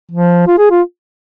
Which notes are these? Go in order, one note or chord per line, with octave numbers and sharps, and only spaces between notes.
F3
F4
G#4
F4